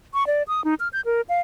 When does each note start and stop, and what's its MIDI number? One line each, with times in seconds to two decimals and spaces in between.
0.14 0.26 85
0.27 0.43 74
0.48 0.64 87
0.64 0.75 63
0.80 0.88 89
0.93 1.01 91
1.05 1.21 70
1.29 1.40 77